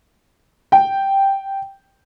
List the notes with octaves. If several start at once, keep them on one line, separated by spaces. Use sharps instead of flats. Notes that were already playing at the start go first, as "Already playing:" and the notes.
G5